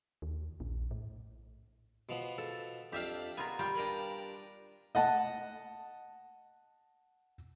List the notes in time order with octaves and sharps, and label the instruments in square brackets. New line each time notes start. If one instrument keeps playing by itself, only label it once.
[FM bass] D#2
A#1
A2
[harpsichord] B2 F3 B3
[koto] A4
[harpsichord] F2 D4 [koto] G4 E5 F5
[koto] B3 F4 A#4 [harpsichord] G#5
[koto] G3 F4 G5
[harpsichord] D4 A#4 B4
[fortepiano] D#5 F#5 A5